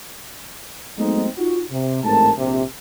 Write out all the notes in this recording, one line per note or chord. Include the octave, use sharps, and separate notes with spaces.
F#3 G#3 A3 B3 C4 D#4
D#4 F4 F#4
C3
A1 G#2 A3 C4 A#4 A5
A#1 C3